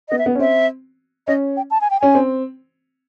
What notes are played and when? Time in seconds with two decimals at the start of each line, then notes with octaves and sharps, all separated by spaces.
0.09 B3 D#5
0.18 E5
0.26 B3
0.35 C#4
0.39 C4 E5
1.27 C#4 D#5
1.57 G5
1.71 A5
1.81 G#5
1.90 G5
2.00 C#4 G#5
2.15 C4